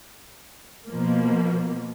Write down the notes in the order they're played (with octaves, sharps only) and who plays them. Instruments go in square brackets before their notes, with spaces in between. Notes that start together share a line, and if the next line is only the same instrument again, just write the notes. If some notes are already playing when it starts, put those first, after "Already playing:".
[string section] B2 F3 A#3